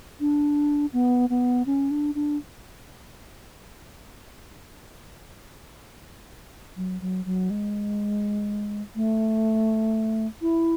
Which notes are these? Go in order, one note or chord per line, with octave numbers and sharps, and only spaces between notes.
D4
B3
B3
C#4
D4
D4
F#3
F#3
F#3
G#3
A3
E4